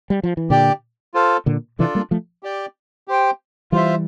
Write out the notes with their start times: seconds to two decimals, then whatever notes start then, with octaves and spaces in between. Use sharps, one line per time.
0.10 G3
0.23 F3
0.37 E3
0.50 A#2 D3 G4 D5 G5
1.14 F4 A4 C5 F5
1.46 A#2 D3
1.79 C3 E3 D4 F4 A4 D5
1.95 G3 A#3
2.11 F3 A3
2.43 G4 D5 G5
3.08 G4 C5 G5
3.72 E3 G3 F4 C5 E5